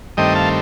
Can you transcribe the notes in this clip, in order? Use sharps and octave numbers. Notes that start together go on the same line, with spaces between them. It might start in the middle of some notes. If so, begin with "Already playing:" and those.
G2 D#3 A3 C4 D#5 G5
F5 A5